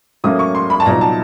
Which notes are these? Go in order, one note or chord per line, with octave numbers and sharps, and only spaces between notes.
A2 F#3 A#3 C#4 D#6
C#6
C6
B5
A5
C2 A#2 F#3 B3 D#4 A#5
A5